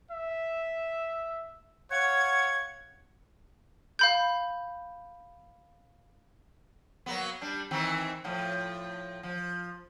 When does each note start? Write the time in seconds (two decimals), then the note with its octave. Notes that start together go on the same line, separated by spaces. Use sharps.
0.11 E5
1.91 C#5 F5 F#5 G#6
3.99 F5 B5 G6
7.06 F#3 A#3 B3
7.41 G3 D4
7.71 D#3 E3 C4
8.24 A2 F3
9.23 F3